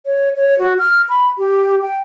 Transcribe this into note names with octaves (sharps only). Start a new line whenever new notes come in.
C#5
C#5
F#4
F6
B5
G4
G5